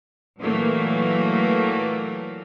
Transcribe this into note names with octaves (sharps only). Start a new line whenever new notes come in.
A#2 E3 F#3 A3 A#3